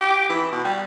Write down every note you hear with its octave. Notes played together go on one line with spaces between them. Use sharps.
G4
E3
B2
G3